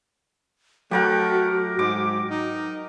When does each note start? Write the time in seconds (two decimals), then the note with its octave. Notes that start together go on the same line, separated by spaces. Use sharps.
0.91 F#3 A3 F#4 G4 A#4 F#5
1.79 G#2 D6
2.30 D#4